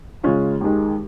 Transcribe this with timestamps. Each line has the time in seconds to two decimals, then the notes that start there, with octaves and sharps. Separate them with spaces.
0.23 C#3 G#3 C#4 F4
0.61 D#2 D#3 G#3